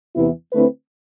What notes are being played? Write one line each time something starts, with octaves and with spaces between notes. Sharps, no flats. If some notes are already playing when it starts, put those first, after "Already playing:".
E2 C3 E3 B3 E4
D3 A3 C4 E4 B4